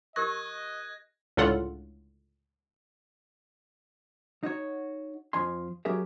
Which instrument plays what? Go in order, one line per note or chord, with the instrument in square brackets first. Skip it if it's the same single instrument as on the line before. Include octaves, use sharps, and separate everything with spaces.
[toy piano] G4 A#4 C#6 [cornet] D#5 [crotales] F#6 G#6 A#6
[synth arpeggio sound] C#2 A2 D3 F4 A4 F#5
[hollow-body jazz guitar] D#4 F#4 C#5
F2 F3 G#5 C6
F#3 C#4 G4 G#4 A#4 E5